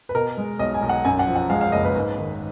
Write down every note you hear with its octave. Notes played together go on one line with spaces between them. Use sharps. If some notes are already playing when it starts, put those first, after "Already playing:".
B4
B2 A#4
G#3
B1 D#5
G#5
B1
F#5
F#2 G#5
F#5
F3
F#5
G#3 F5
F5
F#1 D#5
B4
G#2
D#3